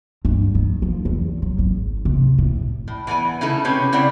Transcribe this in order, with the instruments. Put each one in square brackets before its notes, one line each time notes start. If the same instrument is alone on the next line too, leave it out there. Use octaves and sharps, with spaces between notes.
[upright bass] G2
D#3
F3
E2
F#3
G#1
C3
A2
[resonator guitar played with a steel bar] A2
E3 B3 B4 G#5
C#3 A3 D#4 E4 A4
C3 C4 C#4 G4 B4 C#5
C#3 C4 E4 D5 F#5